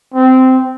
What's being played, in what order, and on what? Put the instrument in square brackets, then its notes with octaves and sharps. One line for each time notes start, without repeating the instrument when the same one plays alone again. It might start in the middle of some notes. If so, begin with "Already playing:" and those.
[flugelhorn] C4